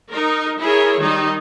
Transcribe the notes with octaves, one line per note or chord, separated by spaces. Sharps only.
D#4 A#4
E4 G#4 A#4 C#5
D#3 G3 D#4